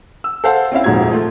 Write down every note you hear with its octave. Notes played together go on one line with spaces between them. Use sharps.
E6
A4 C5 F5 F#5
C4 C#4 E4 F5
D#1 F2 G#2 F#4 G#6
F3 A3 F4